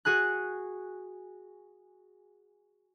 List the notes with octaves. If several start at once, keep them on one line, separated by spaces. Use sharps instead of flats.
F#4 G#4 G#5 F#6